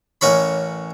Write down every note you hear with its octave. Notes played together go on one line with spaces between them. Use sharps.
A1 C#4 A#4 C#5 B5